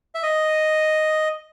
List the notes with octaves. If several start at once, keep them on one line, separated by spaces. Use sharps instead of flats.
E5
D#5